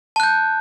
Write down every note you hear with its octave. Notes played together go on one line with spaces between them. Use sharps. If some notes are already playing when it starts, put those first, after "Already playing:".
A5 F#6 G6